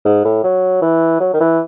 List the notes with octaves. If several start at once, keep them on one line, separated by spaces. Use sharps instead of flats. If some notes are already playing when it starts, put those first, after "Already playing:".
G#2
A2
F#3
E3
F#3
D#3
E3